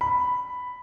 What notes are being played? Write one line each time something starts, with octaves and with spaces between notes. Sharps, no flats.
B5